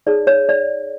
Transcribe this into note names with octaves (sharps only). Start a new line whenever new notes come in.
D#4 G#4 C#5 D5
C#5
D5